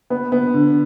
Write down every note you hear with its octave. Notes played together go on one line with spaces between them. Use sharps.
B3
B3
D3